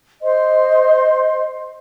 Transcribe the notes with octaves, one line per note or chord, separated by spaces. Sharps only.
C5 D#5 C6